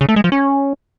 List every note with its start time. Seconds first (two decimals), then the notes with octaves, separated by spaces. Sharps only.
0.01 C#3
0.09 A3
0.16 G#3
0.24 F3
0.32 C#4